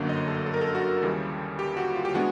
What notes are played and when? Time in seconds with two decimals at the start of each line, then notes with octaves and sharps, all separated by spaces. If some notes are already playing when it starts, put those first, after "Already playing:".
Already playing: G1 F#2 D3 F#3 A#3
0.09 D#5
0.28 A4
0.46 A4
0.54 A#4
0.61 A4
0.75 F#4
1.02 D#2 C#3 E3 G3
1.59 G4
1.77 F#4
1.96 F4
2.05 G4
2.14 E3 G#3 B3 D4 F#4